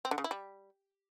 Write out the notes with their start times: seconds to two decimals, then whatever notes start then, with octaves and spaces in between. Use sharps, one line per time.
0.05 C4
0.11 D3
0.18 C#3
0.24 E4
0.31 G3